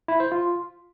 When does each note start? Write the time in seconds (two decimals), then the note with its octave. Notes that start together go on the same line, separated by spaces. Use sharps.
0.08 E4
0.20 C5
0.32 F4